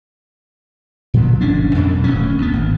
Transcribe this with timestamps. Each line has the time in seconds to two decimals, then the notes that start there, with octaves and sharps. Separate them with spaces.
1.14 A#2 F3 F#3
1.41 G1 C#4 D4
1.75 F2 B2 F#3
2.04 D1 D2 C#4
2.38 D2 B3
2.53 G#1